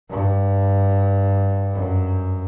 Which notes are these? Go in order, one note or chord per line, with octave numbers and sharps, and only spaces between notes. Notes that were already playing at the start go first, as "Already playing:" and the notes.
G2
F#2